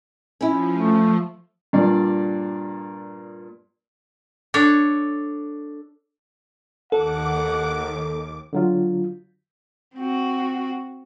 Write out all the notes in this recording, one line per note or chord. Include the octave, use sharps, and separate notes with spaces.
F3 C#4 E4
A3
G2 A#2 D5
D4 A4 C#5
D#2 A4 F#5 D6
D3 F#3 F4
C4 F#4